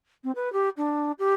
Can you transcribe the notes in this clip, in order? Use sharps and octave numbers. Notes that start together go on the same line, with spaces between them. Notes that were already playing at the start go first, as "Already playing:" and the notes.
C4
B4
G4
D4
G4